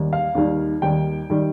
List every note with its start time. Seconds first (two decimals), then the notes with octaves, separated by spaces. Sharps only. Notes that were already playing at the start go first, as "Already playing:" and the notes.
Already playing: D#2 D#3 G3
0.13 F5
0.35 D#2 D#3 G3
0.82 D#2 D#3 G3 G5
1.30 D#3 G3